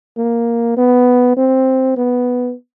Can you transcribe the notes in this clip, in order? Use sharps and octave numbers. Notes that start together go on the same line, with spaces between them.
A#3
B3
C4
B3